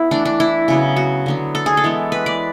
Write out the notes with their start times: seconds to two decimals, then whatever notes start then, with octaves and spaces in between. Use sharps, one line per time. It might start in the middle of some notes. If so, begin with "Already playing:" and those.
Already playing: B3 E4
0.11 E3 A3 D4
0.25 D4
0.40 E4
0.68 C#3 F#3 B3
0.96 F#4
1.26 D3 F#3 B3
1.55 A4
1.66 G#4
1.77 A4
1.84 E3 G#3 B3
2.12 B4
2.26 D5